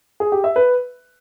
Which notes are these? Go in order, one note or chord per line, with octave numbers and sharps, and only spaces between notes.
G#4
G4
E5
B4